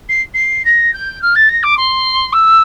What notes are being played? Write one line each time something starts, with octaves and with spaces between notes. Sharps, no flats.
C7
C7
A#6
G6
F6
A6
A#6
D6
C6
E6